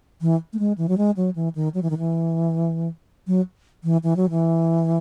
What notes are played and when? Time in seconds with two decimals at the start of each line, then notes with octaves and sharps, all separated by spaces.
0.21 E3
0.53 A3
0.59 G#3
0.78 E3
0.89 F#3
0.98 G#3
1.17 F#3
1.35 E3
1.55 D#3
1.74 F#3
1.82 E3
1.90 D#3
1.98 E3
3.27 F#3
3.84 E3
4.03 E3
4.16 F#3
4.30 E3